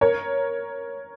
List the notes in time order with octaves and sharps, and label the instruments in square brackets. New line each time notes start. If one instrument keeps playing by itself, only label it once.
[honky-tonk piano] A#4 C#5